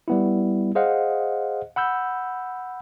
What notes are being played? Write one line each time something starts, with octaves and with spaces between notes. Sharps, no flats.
G3 B3 E4
G#4 C5 D#5 F5 F#5
F#5 B5 E6 G6